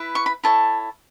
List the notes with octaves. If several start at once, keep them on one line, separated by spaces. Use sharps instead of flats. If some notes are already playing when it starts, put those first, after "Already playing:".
Already playing: E4 B4
C#6
B5
E4 A4 C#5 A5